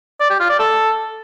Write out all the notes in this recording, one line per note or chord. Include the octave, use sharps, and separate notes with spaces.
D5
G4
F4
D5
A4